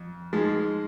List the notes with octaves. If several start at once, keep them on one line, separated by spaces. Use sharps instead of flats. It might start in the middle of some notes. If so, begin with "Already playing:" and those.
Already playing: F2
G#2 F3 G#3